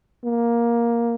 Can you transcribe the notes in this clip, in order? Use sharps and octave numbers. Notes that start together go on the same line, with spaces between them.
A#3